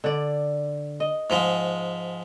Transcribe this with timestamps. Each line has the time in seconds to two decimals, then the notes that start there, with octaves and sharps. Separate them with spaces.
0.04 D3 D5
1.00 D#5
1.30 G#2 F3 G#3